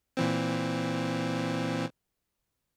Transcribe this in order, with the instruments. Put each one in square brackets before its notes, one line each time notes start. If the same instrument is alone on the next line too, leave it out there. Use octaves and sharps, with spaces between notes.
[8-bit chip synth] A#2 E3 C4